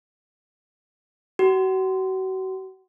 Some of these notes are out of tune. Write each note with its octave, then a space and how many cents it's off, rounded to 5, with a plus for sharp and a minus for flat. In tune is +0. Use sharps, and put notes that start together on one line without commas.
F#4 +35